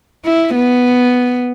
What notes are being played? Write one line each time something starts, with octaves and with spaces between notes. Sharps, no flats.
E4
B3